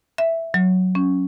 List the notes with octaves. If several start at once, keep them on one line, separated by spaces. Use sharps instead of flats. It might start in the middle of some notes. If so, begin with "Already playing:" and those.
E5
F#3
C#4